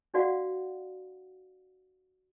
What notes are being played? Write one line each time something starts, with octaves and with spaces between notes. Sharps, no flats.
D4 F#4 D5 F5 F#5